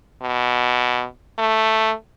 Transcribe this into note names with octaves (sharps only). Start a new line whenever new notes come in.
B2
A3